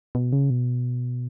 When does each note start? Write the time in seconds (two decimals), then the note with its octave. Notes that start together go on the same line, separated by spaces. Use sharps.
0.15 B2
0.33 C#3
0.50 B2